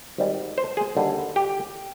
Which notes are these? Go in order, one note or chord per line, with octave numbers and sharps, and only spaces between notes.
G#1 G#2 G3
C5
G#4
D#2 D3 G3
G4